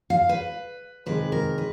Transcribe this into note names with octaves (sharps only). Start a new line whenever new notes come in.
F5
B4
C3 D#3 G#3 B4
A#4
B4